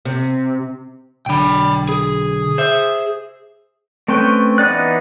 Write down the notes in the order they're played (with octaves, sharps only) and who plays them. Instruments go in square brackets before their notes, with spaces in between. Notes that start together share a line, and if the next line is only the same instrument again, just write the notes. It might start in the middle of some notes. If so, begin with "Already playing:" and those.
[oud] C3
[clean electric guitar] B1 D3 [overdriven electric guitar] G5 B5
[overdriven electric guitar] G#4
[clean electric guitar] C5 E5
[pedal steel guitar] A3 C4 C#4 B4 G5
E3 B3 D#4 D5 F#6